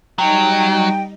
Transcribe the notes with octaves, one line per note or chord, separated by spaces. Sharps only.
F#3 G3 D#4 D#5 G5